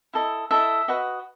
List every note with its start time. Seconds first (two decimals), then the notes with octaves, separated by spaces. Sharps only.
0.14 E4 A4 D#5
0.51 E4 A4 D#5 E5
0.88 F#4 B4 D#5